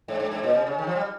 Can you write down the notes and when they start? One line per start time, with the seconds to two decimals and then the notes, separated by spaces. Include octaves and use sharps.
0.08 G#2
0.20 G#2
0.31 G#2
0.43 A#2
0.55 C3
0.67 C#3
0.78 D#3
0.87 F3
0.95 G3